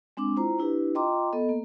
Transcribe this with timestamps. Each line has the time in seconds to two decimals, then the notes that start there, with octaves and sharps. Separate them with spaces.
0.17 G#3 C4 D4 D6
0.37 E4 F4 C5 A#5
0.58 D4 E4 G4 B4
0.95 F4 D#5 G5 A#5 C6 D6
1.33 B3 A4 D#5
1.49 A#3